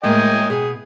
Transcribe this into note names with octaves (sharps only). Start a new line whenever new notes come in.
A2 G#3 A#3 D#5 G5 G#5
B2 G#4